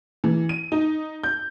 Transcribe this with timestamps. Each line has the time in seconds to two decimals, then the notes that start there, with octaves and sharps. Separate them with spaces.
0.24 E3
0.49 D#7
0.72 D#4
1.24 G6